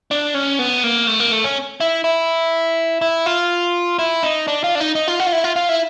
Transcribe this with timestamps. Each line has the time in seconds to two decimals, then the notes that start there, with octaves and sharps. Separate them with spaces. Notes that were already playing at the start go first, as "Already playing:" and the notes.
0.11 D4
0.35 C#4
0.59 B3
0.84 A#3
1.07 A3
1.20 A#3
1.32 A3
1.44 C#4
1.80 E4
2.04 E4
3.01 E4
3.26 F4
3.99 E4
4.23 D#4
4.48 D4
4.64 F4
4.75 D4
4.80 D#4
4.95 D#4
5.08 F4
5.20 F#4
5.27 F4
5.32 E4
5.44 F4
5.56 F4
5.69 E4